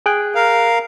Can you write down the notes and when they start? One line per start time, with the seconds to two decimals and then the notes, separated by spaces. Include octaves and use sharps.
0.06 G#4 G5 F#6
0.35 A#4 F5